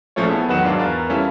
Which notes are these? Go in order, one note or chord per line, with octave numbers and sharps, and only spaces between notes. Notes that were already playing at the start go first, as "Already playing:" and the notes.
A#1 F3 A3 C#4 F4 C#5
B3 E4 G#4 A4
E2 D#3 F#3 B4 F#5 E7
G#2 F#3 D4 F4
E2 A#4 B4 A6
G3 C#4 E4 F4 A4